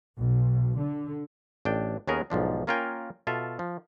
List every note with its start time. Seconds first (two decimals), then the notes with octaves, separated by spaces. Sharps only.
0.18 B1
0.77 D3
1.65 A1 D4 G5
2.07 D#2 B3 C#4 G#4 A#4
2.30 B1 G#2 F3 D4
2.67 A#3 C#4 F4 A#4 G5 G#5
3.27 B2 F4 A4 E5
3.59 F3